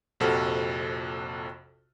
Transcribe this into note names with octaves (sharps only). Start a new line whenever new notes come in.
A#1 F2 C3 F#4 A4 F6